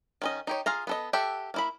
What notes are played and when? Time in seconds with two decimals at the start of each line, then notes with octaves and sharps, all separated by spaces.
0.22 D#3 C#4 D#5
0.47 D#4 G4 C#5
0.66 F4 G#4 F5 A#5
0.87 B3 A4 D#5
1.13 G4 A4 E5 F#5
1.54 A#3 E4 B5